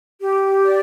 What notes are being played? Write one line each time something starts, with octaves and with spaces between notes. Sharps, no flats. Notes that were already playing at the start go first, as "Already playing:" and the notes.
G4
D5